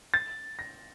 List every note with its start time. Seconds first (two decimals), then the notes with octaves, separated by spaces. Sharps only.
0.14 A6
0.59 A#6